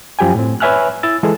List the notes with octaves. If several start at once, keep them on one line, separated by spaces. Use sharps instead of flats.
F#2 F3 G4 G5 G#5
A2 C4
B4 C#5 E5 G#5 F6 F#6
E4 E6 A6
E3 G#3 G#4 A4